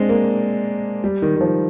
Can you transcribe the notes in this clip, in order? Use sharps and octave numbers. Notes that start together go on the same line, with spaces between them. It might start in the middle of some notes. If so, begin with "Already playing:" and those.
Already playing: G#3 C4 D4
A#3
G3
D#3
D#3
F3